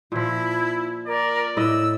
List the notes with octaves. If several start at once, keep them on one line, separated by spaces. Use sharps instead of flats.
A#2 F3 E4
A#4 D5
A2 E4 D#5 E6